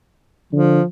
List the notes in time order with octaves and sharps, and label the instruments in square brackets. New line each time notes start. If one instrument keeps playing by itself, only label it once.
[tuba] D3 [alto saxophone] F3